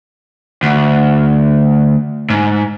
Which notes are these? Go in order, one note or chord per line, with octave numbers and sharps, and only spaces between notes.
D2
G#2